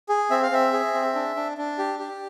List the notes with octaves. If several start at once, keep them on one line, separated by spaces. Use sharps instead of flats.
G#4
C4 E5
F5
C4 E5
G#4
C4
D4
D4
D4
G4
G4